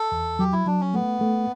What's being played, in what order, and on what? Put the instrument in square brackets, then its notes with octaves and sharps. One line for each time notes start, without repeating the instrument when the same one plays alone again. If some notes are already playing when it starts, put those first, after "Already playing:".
Already playing: [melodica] A4
[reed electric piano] E2
[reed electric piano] F#3 [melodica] G4
[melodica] E4
[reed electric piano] F#3 [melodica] D4
[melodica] C#4
[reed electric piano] A3 [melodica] B3
[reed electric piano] A3